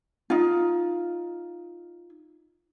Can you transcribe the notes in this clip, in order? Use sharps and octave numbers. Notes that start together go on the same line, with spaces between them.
D#4 F4